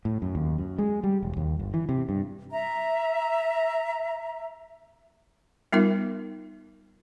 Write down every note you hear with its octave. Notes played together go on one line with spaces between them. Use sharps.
A2
F#2
D#2
F#2
G#3
G3
E1
D#2
G1
E3
C3
G2
E5 A#5
G3 B3 D#4 F4 A#4 E5